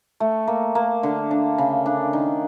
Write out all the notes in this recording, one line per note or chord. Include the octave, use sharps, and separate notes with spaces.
A3
A#3
A#3
D3
D4
C#3
D4
D#3